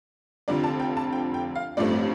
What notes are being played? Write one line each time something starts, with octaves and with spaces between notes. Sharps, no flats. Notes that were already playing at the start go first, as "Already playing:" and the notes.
F1 F2 D3 F3 D5
A5
G5
A5
G5
G5
F5
A1 G2 F3 A3 C4 D5